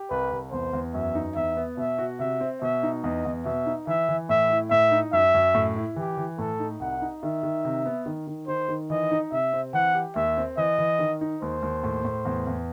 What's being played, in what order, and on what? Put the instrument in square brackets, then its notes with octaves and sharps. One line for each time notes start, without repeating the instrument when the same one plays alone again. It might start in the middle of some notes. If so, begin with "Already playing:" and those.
Already playing: [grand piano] G4
[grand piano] C2 [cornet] B4
[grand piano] C2
[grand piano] E2 [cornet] C5
[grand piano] E2
[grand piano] F#2 [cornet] E5
[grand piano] D#4
[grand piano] E2 [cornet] E5
[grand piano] B3
[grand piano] B2 [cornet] E5
[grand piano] F#4
[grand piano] C3 [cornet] E5
[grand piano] C4
[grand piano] B2 [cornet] E5
[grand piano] D#4
[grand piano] E2 [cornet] D#5
[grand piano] E2
[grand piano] B2 [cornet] E5
[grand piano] D#4
[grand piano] E3 [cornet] E5
[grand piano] E3
[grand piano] A2 [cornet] E5
[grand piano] E4
[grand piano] A2 [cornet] E5
[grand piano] D#4
[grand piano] F#2 [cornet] E5
[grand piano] F#2
A2
E4
[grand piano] E3 [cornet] G4
[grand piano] E3
[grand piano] A2 [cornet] A4
[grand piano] D#4
[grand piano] C2 [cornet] F#5
[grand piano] D#4
[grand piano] D#3 [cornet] E5
[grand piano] D#3
C3
B3
D#3
D#3
[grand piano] D#3 [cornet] C5
[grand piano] D#3
[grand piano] E3 [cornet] D#5
[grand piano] D#4
[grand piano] C3 [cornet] E5
[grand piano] C4
[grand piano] E3 [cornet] F#5
[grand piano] G4
[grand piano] D#2 [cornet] E5
[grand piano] C4
[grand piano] E3 [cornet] D#5
[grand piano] E3
D#3
D#4
[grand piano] D#2 [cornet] C5
[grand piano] D#2
A2
A2
E2
E2